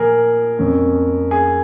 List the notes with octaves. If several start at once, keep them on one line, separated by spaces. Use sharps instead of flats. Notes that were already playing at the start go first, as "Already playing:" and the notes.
Already playing: A#2 F3 A#3 G#4 A#4
F2 F3 A#3 C#4
G#4